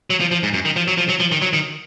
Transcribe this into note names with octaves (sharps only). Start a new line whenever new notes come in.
F#3
F3
F3
G#2
F#2
D#3
F3
F#3
F3
F#3
F3
D#3
F#3
D#3